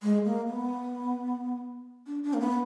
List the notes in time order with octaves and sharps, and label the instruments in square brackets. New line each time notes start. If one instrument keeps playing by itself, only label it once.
[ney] G#3
A#3
B3
D4
D4
A#3
B3